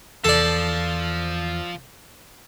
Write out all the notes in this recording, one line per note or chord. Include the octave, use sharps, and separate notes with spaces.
E2 F3 A4 D5